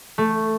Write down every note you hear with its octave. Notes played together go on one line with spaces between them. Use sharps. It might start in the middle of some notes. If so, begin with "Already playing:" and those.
A3